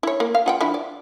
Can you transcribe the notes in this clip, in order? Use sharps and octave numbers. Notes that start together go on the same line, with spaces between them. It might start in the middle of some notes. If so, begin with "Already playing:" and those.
E4 C#5
A#3
F5
F4 F#5 G5
F3 D4 E4
D5